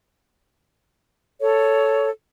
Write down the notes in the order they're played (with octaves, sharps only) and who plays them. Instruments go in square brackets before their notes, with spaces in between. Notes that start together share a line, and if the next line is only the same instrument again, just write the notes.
[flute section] A4 C#5